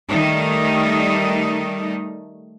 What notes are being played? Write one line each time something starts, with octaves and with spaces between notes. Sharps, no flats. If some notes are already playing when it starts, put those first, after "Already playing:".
D#3 G3 A3 D#4